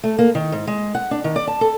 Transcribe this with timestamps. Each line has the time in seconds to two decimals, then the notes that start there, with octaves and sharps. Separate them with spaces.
0.04 A3
0.19 A#3
0.35 D#3
0.52 G#2
0.67 G#3
0.95 F#5
1.11 D4
1.24 D#3
1.36 D5
1.47 A5
1.61 A4